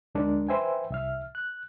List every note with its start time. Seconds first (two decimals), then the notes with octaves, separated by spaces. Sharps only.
0.15 D2 G#3 D4 A#4
0.48 B4 C5 E5 G5 G#5
0.90 C2 E5 F6
1.35 F#6